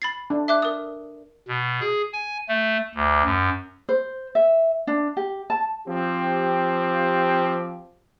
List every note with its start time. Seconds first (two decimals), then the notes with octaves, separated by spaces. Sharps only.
0.02 B5 A6 C7
0.30 D4
0.48 E5 D6 F#6
0.62 A#4 D#6
1.48 B2
1.80 G#4
2.13 G#5
2.49 A3
2.95 D2
3.25 F#2
3.89 C5
4.35 E5
4.87 D4
5.17 G4
5.50 A5
5.87 F3 C4 G4